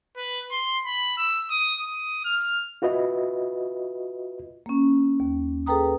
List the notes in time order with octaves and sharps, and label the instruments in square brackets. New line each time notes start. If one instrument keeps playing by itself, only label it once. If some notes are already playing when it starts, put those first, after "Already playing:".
[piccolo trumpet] B4
C6
B5
E6
D#6
D#6
F6
[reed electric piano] F4 F#4 B4 D#5 E5
[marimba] A#3 C#4
D#2
G#4 A4 B4 G5 A#5 D#6